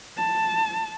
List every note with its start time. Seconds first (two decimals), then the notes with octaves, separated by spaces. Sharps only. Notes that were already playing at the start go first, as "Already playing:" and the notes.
0.17 A5